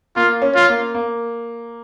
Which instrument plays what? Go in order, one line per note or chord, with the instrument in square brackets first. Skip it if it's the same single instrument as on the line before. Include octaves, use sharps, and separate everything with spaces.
[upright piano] A#3 [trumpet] F4
[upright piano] C#4
[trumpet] F4
[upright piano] A#3
A#3